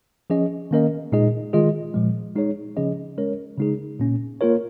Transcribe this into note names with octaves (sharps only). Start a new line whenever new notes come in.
F3 C#4 G#4 D#5
D#3 A#3 C#4 A#4 D#5
A#2 G#3 D#4 G#4 D#5
D#3 G#3 F4 G#4 D#5
A#2 F3 G#3
G#3 D#4 G#4 C#5
C#3 F3 C#4 G#4 D#5
G#3 C#4 A#4 C#5
C#3 G#3 D#4 G#4
A#2 A#3 C#4
A#3 F4 A#4 C#5